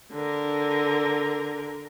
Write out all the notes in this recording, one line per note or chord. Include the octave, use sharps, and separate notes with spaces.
D3 A#4